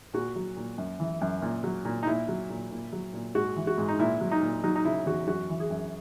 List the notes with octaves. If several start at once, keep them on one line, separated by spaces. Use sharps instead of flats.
A#2 F#4
F#3
A#2
F#2
E3
F#2
A#2
F#3
A#2
D#4
A#2 E4
F#3
A#2
A#2
F#3
A#2
G#2 F#4
E3
F#4
G#2
D#4
A#2 E4
F#3
D#4
A#2
F#3 D#4
D#4
C#3 E4
E2 F#4
F#2 F#4
E3
G#4
F#2